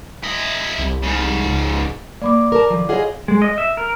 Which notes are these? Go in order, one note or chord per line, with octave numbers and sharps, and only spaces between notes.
E4 D#5
C2
G#2 C#3
C#2
A#3 D5 B5 D6
A#4 A5
D#3 F3
F4 G#4 C#5 D#5 F5 F#5
G#3
D#5
E5
A#4